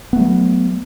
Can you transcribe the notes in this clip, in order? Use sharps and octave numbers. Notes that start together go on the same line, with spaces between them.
F#3 A3 B3